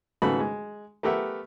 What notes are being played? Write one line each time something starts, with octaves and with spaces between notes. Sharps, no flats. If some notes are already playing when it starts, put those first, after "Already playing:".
G#2 C#3 B3 F#4 A4 B5
G#3
A3 B3 G4 A#4 E5 F#5